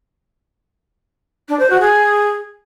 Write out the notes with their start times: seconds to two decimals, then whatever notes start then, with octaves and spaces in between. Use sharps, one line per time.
1.48 D4
1.59 C5
1.70 F#4
1.81 G#4